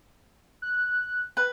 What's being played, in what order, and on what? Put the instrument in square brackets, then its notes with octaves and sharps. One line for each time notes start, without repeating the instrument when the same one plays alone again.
[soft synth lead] F#6
[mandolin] B4